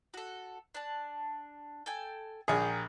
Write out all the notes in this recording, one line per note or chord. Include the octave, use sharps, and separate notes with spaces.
F#4 A4
D4 A5
A4 G5 G#5
A#1 G4 G#4 A#4